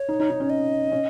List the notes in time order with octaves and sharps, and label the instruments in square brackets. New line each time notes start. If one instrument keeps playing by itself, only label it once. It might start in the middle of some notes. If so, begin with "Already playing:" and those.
Already playing: [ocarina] C#5
[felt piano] D#4
D#4
D#4
C#4
[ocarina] D#5
[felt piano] C#4